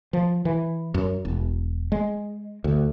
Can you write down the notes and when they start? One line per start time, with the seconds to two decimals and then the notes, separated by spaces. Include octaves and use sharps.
0.13 F3
0.45 E3
0.94 F#2
1.25 E1
1.92 G#3
2.64 D2